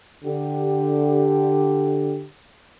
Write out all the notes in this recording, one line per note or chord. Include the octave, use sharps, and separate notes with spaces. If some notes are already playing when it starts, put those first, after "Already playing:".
D3 G4